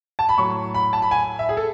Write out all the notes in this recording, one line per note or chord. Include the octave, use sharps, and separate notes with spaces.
A5
B5
A2 F#3 C#6
B5
A5
B5
G#5
E5
G#4
A4